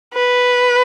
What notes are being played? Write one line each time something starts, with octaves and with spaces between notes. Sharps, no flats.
B4